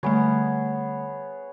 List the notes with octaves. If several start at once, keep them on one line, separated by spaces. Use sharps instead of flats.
D3 G3 A3 B3 G#4 C#5